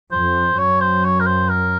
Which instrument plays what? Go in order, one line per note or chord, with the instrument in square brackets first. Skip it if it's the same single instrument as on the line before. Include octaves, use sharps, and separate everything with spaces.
[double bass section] F2 [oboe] C5
[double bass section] F#2 [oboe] C#5
[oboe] C5
C#5
A#4
C5
A#4